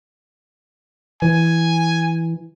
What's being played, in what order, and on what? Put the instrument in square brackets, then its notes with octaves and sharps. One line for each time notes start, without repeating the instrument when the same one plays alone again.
[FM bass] E3 [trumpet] G#5